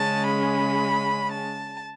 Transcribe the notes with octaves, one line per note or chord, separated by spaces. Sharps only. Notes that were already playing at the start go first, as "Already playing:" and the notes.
Already playing: C#3 G#3 C#4 A5
B5
A5